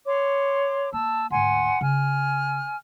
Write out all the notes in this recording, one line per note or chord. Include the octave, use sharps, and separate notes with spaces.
C#5 C6 D6
A#3 A5 E6
D2 G#2 F#5 G#5 C6
C#3 G#5 F6